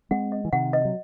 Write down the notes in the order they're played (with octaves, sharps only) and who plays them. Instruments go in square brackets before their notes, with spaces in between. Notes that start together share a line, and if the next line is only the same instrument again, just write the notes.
[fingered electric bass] G#3 C4 [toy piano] F#5
[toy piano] D#5
[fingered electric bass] E3
[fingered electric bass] C3 D#3 [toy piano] F#5
[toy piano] D#5
[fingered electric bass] F#3